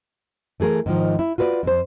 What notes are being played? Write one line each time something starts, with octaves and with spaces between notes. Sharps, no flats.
E3 A3 G#4 A#4
G#2 D#3 F3
E4
F4 F#4 B4 C5 D5
F2 C5